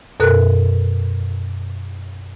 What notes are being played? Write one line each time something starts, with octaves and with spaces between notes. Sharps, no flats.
F#2 B2 A4 A#4 F#6